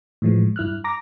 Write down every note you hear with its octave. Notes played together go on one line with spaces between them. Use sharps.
A2 E3 F3 G#3
G2 E4 F6 F#6
A#5 D6 A#6